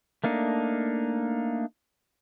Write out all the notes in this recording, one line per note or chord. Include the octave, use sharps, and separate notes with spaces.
A3 A#3 D4 D#4